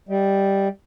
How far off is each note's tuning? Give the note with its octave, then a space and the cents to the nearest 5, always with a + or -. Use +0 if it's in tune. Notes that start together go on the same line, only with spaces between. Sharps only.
G3 +0 D#5 +30